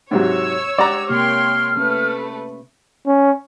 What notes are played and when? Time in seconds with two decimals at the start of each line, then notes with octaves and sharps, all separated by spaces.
0.11 G#2 C3 F#3 C#5 E6
0.78 G#3 G4 D5 F#5 A#5
1.09 C3 A#3 G4 C#5 G5 C6 F6
1.77 A3 C#4 B4
3.06 C#4